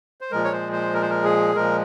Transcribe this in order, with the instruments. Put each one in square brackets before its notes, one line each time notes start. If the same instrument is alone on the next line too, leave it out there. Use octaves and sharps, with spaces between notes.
[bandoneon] C5
A#2 F3 G#3 A#4
C#5
C5
C5
A#4
C5
A#4
G#4
A#2 F3 G#3 A#4